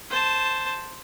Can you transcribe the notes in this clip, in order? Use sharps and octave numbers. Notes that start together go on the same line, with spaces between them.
C5 A5